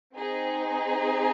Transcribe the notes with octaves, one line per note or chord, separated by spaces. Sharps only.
C4 D#4 G#4